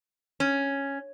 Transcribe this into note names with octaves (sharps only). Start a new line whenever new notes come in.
C#4